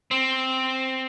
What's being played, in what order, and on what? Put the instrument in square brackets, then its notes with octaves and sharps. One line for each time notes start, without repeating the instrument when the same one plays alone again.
[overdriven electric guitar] C4